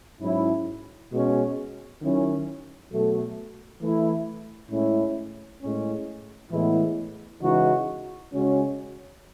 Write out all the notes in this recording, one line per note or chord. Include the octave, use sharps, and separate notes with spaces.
G#2 F#3 C#4 E4
B2 G#3 C#4
D#3 F#3 C#4 E4
B2 F#3 A3
E3 A3 E4
A2 G#3 C#4 E4
A2 G#3 C#4
A2 E3 G#3 B3 E4
C#3 E3 G#3 D#4 F#4
C#3 G#3 C#4 F#4